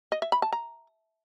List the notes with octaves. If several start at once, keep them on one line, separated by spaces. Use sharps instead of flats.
D#5
E5
B5
A5
A#5